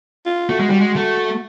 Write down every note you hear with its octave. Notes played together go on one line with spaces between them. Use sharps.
F4
A3 F#4
G#3
G3
G#3
A3